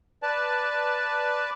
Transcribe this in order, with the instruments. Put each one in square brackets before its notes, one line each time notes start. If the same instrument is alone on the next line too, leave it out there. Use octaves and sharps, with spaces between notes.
[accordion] B4 D5 A5